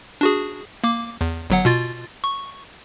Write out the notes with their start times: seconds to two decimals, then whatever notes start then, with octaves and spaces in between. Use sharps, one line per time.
0.21 D4 F#4 G#4
0.84 A#3 D6
1.21 E2
1.50 G1 F#3 F#5
1.65 B2 F4 A6
2.24 C#6